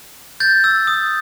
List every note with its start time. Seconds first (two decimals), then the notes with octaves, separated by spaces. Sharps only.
0.40 G6 A6
0.64 E6
0.87 D#6